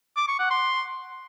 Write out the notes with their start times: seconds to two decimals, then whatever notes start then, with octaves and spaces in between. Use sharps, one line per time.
0.17 D6
0.28 C#6
0.39 F#5
0.51 C6